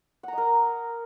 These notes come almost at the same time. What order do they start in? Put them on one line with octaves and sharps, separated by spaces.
F#5 A#5 D#5 A#4